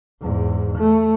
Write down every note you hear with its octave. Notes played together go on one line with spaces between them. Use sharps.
E2 G#2
A3